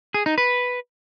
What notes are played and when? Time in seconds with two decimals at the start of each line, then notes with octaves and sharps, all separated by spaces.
0.14 G#4
0.26 D#4
0.38 B4